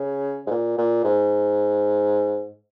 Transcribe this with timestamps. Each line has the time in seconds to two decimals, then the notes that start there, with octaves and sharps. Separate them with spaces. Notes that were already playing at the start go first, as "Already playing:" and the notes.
Already playing: C#3
0.47 G#2
0.51 A#2
0.78 A#2
1.04 G#2